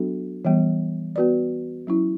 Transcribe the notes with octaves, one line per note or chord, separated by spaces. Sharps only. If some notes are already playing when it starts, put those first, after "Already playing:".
Already playing: F#3 B3 D4 F#4 A4
E3 G3 B3
B3 F#4 B4 D5
F#3 C#4 E4